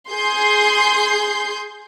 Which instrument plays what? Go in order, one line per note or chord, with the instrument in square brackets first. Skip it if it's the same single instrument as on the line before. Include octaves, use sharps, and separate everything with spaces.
[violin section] G#4 C6 G6